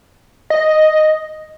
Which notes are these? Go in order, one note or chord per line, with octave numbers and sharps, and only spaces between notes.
D#5